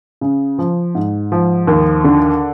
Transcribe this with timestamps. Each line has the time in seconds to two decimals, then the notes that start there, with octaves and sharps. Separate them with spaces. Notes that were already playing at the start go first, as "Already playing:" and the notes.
0.21 C#3
0.59 F3
0.95 G#2
1.32 F3
1.67 D#2
2.04 D3